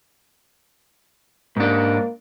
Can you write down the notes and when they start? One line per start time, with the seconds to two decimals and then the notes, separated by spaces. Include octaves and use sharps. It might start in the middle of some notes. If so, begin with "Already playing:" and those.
1.57 G#2 A#3 D4